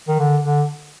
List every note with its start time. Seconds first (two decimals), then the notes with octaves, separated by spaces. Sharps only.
0.08 D#3
0.19 D3
0.44 D3